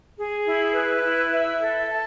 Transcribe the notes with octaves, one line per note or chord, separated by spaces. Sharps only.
G#4
E4
B4
E4
E5
A4
A5